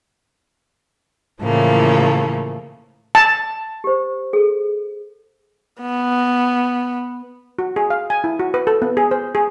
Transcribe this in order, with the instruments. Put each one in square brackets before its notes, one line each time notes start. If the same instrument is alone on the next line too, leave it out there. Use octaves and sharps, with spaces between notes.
[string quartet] A2 C#3 E3 F3 A3 A#3
[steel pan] A5
[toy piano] G4 C5
G#4 A4
[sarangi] B3
[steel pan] F#4
G#4
F5
G#5
E4
F#4
B4
A4
B3
G#4
C5
G#4